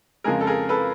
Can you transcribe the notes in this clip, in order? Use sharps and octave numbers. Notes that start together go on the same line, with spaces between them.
F2 C#3 F3 G#3 G#4 A#4
A4
G#4 A#4
A4 B4